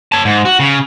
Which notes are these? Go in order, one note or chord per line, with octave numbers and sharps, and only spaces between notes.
C#5 A5
G#2
F#4
C#3